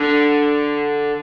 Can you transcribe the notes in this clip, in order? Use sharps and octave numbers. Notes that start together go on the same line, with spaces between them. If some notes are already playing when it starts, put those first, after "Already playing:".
Already playing: D3